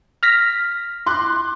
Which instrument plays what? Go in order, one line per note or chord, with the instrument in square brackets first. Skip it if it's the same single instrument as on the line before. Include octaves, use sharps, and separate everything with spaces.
[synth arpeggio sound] F6 A#6 B6
[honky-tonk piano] C6 D6 F#6